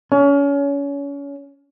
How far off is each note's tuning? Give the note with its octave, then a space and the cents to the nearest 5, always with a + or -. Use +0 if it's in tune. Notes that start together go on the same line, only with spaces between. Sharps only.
C#4 +30